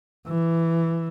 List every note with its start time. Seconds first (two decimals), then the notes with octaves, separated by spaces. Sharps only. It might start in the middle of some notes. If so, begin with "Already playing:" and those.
0.27 E3